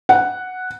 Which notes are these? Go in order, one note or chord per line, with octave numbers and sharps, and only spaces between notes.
F#5